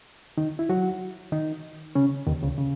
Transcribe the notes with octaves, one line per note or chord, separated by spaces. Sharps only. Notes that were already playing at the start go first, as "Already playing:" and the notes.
D#3 D#4
E4
F#3 F#4
D#3 D#4
C#3 C#4
D#2 D#3
C#2 C#3
C#3